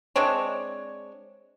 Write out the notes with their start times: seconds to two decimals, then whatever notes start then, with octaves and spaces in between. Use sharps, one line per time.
0.16 G#3 C4 D4 C#5